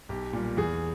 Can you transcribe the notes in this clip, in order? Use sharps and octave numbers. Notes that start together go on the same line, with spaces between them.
B1 G4
A#2 G3
E2 G#4